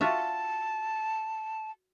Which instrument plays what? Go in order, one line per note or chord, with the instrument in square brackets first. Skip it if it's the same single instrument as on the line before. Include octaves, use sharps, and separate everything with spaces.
[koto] F4 F#4 E5 [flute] A5